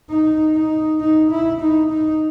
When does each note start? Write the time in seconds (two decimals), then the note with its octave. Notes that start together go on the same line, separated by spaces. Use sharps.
0.10 D#4
0.55 D#4
1.01 D#4
1.31 E4
1.62 D#4
1.91 D#4